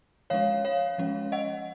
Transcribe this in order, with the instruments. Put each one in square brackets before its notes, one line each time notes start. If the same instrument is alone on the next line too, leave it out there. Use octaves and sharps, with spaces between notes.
[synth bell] F3 G#3 C#4 C#5 F5
C#5 F5
F3 G#3 C#4
D#5 F#5